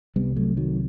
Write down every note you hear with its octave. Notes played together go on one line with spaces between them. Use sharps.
C2 C3 G3 B3
F#3 A3
D#3 F#3